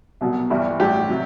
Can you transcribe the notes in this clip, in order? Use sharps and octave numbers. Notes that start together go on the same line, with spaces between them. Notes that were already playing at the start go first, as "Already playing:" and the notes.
C2 B2 F#3
G1 G2 E3 G3
A1 G2 F#3 G4
C3 F#3